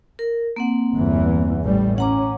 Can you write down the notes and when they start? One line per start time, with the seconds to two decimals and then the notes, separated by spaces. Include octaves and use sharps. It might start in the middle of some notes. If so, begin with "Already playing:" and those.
0.19 A#4
0.56 A#3 C4 F#5
0.94 G1 E2 E3
1.66 A1 A2 G3
1.98 C#4 F#5 A#5 D6